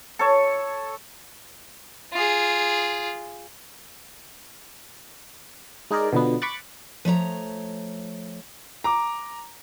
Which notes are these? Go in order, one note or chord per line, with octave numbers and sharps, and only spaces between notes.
A4 C#5
F4 G#4
G#3 D#4 G#4 A#4 D5
B2 D3 F3 B3
B5 C#6 D6 F#6 A6
F3 A3 C#5 A#5
A#5 D6